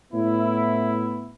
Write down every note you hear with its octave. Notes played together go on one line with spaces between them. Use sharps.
A2 B3 E4